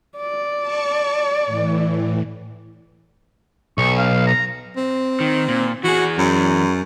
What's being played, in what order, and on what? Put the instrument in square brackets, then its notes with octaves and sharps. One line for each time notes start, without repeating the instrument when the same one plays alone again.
[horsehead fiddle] D5
[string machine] A5 C#6
A2 E3
[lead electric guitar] B1 [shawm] C#6
[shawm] F5
A#5
[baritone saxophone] C4
[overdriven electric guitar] D#3
A#2
[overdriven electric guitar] E3 G#4 [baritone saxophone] F#4
[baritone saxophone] F#2